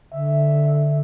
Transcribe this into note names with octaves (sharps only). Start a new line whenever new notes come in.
D3 E5